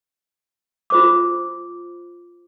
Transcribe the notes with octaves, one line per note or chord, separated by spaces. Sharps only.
F4 C5 D6